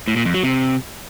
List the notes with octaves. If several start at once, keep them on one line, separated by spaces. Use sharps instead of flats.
A2
A#2
F2
F#3
C3